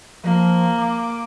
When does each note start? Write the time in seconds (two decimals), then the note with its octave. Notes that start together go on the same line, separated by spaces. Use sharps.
0.24 F3 A#3
0.78 D6